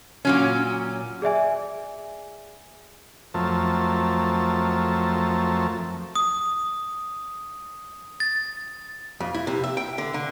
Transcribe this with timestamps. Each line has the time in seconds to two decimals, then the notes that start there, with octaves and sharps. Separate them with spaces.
0.25 A#2 F#3 C#4
1.22 G#4 D5 E5 G#5
3.34 F2 F3 F#3 A3 A#4 A5
6.15 D#6
8.20 A6
9.20 F2
9.34 E4
9.47 C3
9.64 E5
9.77 G5
9.98 D3
10.14 D3